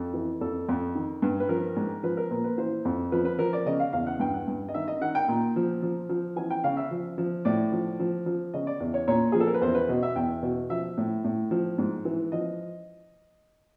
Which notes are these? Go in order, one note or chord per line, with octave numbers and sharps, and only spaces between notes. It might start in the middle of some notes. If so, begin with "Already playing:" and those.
Already playing: F2 A4
E3
F2 A4
F2
D#3
G2
B4
F3 A#4
G#2
F3 B4
A#4
A#2 B4
B4
E3 C5
F2
F3 B4
B4
F3 A#4
D5
C#3 D#5
F5
E2 F5
F#5
G2 G5
F#5
G2
D#5
D#3 E5
D#5
D#3 F#5
G5
A#2
F3
F3
F3
E3 G#5
G5
C#3 F5
E5
F3
F3
A2 D5
F3
F3
F3
C#3 D#5
D5
E2
C#5
A#2 C#5
F3 G#4
A4
A#4
B4
E2 C5
B4
B2 D#5
E5
E2 G5
B2
F3 E5
A2
A2
F3
G#2
E3
F3 D#5